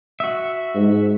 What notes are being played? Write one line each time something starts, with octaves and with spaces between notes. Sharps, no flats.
F#4 E5
G#2